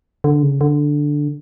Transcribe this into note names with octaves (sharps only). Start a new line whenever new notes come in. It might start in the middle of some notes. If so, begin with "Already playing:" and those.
D3
C#3
D3